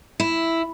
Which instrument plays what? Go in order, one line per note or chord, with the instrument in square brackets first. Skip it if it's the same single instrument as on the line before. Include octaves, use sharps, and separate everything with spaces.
[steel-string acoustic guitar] E4